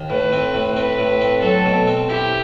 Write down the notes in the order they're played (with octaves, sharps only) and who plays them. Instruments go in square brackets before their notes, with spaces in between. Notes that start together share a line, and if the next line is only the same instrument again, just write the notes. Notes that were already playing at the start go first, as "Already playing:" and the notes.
Already playing: [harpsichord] D#2
[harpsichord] A2 [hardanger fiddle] B4
[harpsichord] C4
A2
[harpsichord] C4 [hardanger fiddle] B4
[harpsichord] A2
C4
[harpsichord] F#3 [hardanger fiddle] A4
[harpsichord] B2
C4
[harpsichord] E4 [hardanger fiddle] G4